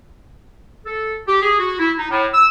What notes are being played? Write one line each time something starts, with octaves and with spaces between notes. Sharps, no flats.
A4
G4
G#4
F#4
E4
D#4
A2
E6